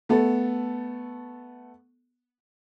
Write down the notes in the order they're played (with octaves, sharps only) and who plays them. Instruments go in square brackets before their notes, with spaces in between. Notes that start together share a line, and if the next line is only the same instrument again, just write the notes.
[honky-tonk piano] A3 B3 A4